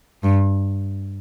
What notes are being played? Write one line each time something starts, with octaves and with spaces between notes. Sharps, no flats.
G2